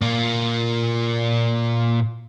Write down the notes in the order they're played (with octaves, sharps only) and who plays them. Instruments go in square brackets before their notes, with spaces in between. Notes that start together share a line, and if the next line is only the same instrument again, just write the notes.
[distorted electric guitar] A#2 A#3